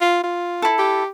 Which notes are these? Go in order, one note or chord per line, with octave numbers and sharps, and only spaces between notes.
F4
F4
E4 A4
G4